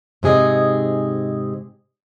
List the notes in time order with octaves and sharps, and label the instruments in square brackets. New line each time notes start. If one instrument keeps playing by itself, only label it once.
[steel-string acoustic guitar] G#2 C3 G#4 D#5